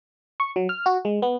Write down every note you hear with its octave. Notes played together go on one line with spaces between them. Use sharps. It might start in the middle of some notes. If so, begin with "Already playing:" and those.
C#6
F#3
F6
F#4
G#3
B3